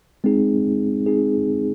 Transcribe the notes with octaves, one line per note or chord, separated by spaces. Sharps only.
G#3 C4 D#4 G#4
G#3 C4 D#4 G#4